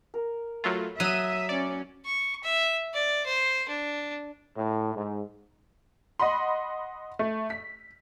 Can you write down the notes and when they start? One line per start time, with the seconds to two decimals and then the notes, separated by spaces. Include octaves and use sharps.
0.14 A#4
0.64 F#3 A3 F4 A4 B5
1.00 F#3 E5 D#6 D#7
1.49 C#4 D5
2.05 C#6
2.43 E5
2.94 D5
3.26 C5
3.68 D4
4.55 A2
4.95 G#2
6.19 D#5 F#5 B5 C6
7.19 A3
7.50 B6